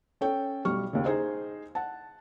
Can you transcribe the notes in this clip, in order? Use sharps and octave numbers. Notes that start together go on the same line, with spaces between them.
C#4 A4 C#5 G5
B1 G3 C#6 F6
D#2 C#3
D#4 G#4 C5 D#5
F#5 A5